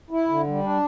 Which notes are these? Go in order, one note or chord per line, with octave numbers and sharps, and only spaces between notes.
E4
D3
G3
D4